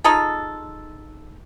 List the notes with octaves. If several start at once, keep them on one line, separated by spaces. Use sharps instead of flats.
D#4 F4 G#4 A4